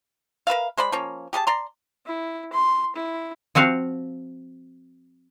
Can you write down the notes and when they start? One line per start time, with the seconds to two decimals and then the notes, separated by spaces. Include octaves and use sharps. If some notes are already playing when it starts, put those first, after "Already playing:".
0.47 A#4 B4 E5 F5
0.77 G#3 C5 D5 B5
0.92 F3 A#3 C#4
1.33 G4 G#4 A#4 A5
1.47 D5 A#5 C6
2.06 E4
2.52 C6
2.95 E4
3.55 F3 C4 F#4 F5